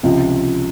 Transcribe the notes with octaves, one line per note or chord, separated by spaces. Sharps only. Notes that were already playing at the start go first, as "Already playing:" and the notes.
C#2 C3 F3